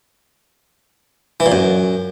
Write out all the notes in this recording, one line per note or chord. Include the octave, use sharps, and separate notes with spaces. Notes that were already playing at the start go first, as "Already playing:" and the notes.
E3
A#2
F#2